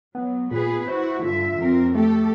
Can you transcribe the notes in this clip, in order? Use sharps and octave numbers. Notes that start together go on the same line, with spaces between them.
F#3 B3
A#2 B3 G#4 B4
E4 F#4 C5
G2 D3 F4 E5
F2 C4 A#4
A3 G4 A4